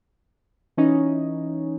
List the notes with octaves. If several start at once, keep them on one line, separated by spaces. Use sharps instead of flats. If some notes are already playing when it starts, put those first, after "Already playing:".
E3 C#4 D#4